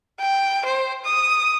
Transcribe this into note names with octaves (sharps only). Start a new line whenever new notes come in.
G5
C5
D#6